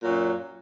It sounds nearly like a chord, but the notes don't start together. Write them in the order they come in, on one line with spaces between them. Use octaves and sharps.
A#2 F#3 F#2